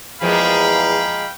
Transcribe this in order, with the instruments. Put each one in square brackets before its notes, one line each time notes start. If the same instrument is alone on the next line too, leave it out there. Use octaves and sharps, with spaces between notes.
[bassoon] E2 [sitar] F3 G#3 A#3 [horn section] F5 G5 B5